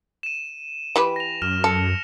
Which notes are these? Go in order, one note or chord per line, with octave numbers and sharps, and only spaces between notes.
D#7 E7
E3 G4 B4
A#6 F7
F#2 F6 E7
A4 C#7